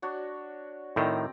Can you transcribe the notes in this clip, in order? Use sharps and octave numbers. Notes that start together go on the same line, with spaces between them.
D4 F#4 C#5
A2 D#3 C4 D5 A#5